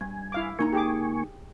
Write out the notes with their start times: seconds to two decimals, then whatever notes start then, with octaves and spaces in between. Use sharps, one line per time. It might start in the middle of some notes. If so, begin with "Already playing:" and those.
0.01 G2 G#5
0.32 E4 F5 D6
0.59 C#2 A#3 D#4 G#5 A#5 C#6
0.73 G4 G#4 D6